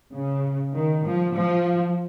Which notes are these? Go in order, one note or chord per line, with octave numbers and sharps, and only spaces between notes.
C#3
D#3
F3
F3